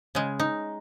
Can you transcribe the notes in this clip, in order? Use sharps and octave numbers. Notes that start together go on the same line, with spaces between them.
C#3 G#3
D#4